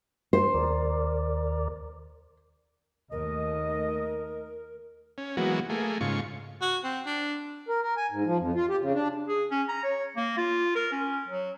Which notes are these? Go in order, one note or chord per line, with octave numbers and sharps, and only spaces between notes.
C5
D#2 A#4 D5
D#2 A3 A#4 D#5
C#4
E3 F#3 G#3 A#3 B3 F#4
A3 A#3 G#4
G#2 C#3 F4 C#6
F#4
C4
D4
A#4
A#4
G#5
G#2
F3
F2
F4
G4
C#3
D4
G#4
C#4
A#5
C#5
A#3
F4
A#4
C#4
F#3